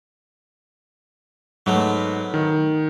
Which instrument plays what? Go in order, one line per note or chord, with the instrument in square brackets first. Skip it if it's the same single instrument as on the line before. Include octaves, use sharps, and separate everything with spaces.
[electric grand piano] G#2 [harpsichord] F#3 A3 B3
[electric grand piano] D#3